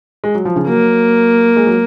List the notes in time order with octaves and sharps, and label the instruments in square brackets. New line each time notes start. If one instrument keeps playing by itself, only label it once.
[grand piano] G#3
F#3
F3
C#3
[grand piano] F#3 [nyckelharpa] A#3
[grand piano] G#3
F#3